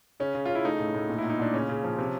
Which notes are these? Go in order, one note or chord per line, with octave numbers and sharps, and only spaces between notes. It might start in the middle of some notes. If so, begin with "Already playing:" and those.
C#3 C#4
C#3
C#3 F4
E4
A3 D#4
A2
A2
A#2
E4
A#2
D#4
A#2 D4
C#3 C#4
C#3
F3
C3